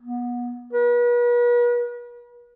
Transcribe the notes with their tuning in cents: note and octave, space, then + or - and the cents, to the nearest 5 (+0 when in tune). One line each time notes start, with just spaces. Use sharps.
B3 -25
B4 -40